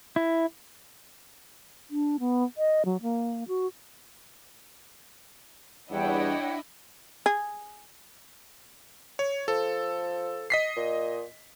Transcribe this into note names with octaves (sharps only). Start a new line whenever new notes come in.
E4
D4
B3
D#5
F#3
A#3
F#4
E2 G3 D4 E4 C#5 D#5 F#5 G5
G#4
C#5
F3 A4
D#5 B6 C7
A#2